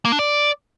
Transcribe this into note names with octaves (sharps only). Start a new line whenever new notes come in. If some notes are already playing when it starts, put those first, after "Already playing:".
A#3
D4
D5